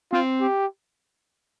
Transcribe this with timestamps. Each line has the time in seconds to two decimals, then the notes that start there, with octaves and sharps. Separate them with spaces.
0.12 C4 F4
0.41 G4